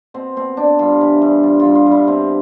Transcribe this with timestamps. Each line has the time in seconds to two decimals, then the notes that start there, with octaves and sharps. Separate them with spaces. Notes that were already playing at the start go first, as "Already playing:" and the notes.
0.14 B2 C4
0.36 B2 C4
0.57 B2 D4
0.79 G2 F4
1.01 E3
1.22 G2
1.44 G2 F4
1.60 F4
1.65 G2
1.75 F4
1.86 G2
1.92 E4
2.07 B2 C4